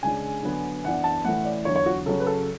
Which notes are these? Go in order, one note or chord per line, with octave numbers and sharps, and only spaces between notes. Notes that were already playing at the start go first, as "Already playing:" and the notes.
C#3 G#3 D4 G#5
D3 F#3 B3
F#2 E3 B3 D4 F#5
A5
A2 E3 A3 C#4 F#5
D5
E2 D3 F#3 C#5
C#5
F#4
C#3 F#3 C#4 A4
B4
A4